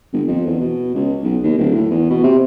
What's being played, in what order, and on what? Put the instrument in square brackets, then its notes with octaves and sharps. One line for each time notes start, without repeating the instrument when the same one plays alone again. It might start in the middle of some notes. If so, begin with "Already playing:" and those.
[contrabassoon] G1
F2
E2
B2
C#2
B1
D#2
D1
A2
E2
B2
C3